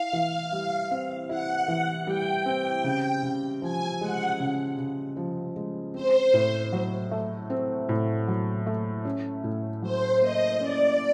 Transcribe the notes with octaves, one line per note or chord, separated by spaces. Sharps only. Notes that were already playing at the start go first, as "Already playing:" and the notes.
Already playing: E4 F5
E3
G3
C4
E4 F#5
E3
G3 G5
C4
C#3
C#3
F3 G#5
G#3 F#5
C#3
C#3
F3
G#3
C4 C5
A2
F#3
A3
C4
A2
F#3
A3
C#4
A2
F#3 C5
A#3 D#5
C#4 D5